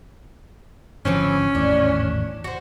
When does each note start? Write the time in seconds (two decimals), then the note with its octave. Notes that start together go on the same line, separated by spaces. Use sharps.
1.05 G#1 D3 E3 F3 A3 C4 C#4
1.55 G#1 E2 A2 D4
2.44 F#4 C5